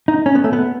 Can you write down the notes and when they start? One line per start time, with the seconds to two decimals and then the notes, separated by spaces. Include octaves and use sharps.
0.08 D#4
0.26 C#4
0.35 B3
0.44 A3
0.53 B3